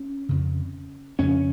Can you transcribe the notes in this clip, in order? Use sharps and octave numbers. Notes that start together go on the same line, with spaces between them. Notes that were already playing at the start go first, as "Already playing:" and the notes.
Already playing: C#4
F2 C#3
F2 C#3 C#4